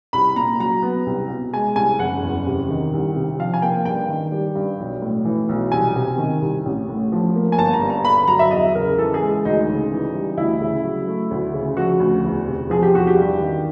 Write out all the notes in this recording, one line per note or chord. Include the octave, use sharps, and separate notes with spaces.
C2 B5
A#2 A#5
F#3 A#5
B3
C2
B2
G#3 G#5
C2 G#5
F#1 F#5
E2
C3
D#3
C2
C3
F3 F5
G#5
A#3 G5
G2 G5
D#3
G3
G2
B1
A2
E3
B1
C2 G#5
C3
D#3
C2
A1
A2
F3
A#3
G#5
G1 A5
A#5
G2
A#5
D3 B5
B5
F#3 A#5
E5
E2 D#5
C#3 A#4
E3 A4
G#4
G#3
D2 D#4
C#3
E3
G3
D2 E4
C#3
F#3
A3
D2
C#3
F3 F#4
D2
E2
C3
F3 G#4
G4
E2 F#4
G4
G2
D#3